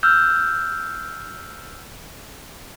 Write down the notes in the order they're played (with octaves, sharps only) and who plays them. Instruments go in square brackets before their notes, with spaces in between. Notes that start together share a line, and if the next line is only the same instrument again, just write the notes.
[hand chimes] E6 F6 G6